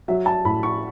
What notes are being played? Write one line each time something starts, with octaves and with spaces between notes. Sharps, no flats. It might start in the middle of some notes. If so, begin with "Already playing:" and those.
F#3 E5
A5
A2 B5
C#6